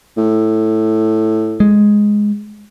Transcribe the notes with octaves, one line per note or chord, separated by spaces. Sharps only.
A2
G#3